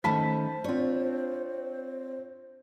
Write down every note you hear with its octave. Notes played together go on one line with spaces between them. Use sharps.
D#3 A3 C#4 C5 A5 B5 B6
C4 D4 F4 C#5